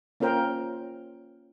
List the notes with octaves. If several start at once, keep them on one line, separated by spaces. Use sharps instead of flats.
A#3 C#4 F4 A#4 C5 G5